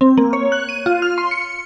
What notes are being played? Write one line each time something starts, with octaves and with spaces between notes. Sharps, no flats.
C4
A#3
C#5
F#6
D#7
F4
F6
C6
C#7